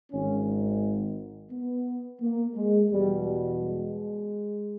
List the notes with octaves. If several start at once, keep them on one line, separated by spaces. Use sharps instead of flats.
G#1 G#2 D#3 C#4
B3
A#3
G#3
E2 B2 G3
G3
G#3